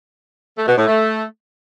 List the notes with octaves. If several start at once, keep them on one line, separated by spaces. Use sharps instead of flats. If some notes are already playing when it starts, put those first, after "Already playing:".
A3
B2
A2
A3